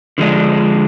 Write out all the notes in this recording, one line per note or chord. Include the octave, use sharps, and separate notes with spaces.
D3 F3 G#3 D4